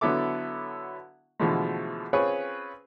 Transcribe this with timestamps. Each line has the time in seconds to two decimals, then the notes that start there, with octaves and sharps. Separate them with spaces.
0.01 D3 F#3 B3 E4 A4 D6
1.40 B2 D3 E3 F3 G#3 A3
2.13 C4 C#4 F4 G#4 B4 C#5